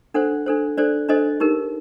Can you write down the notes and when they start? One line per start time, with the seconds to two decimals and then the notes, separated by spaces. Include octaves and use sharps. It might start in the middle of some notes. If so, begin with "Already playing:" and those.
0.14 D4 A4 C5 F#5
0.46 D4 A4 C5
0.78 D4 A4 C5 D5
1.08 D4 A4 C5 D#5
1.40 D#4 G4 A#4